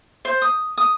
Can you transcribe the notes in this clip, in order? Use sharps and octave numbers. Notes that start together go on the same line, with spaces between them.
C5
D#6
D#6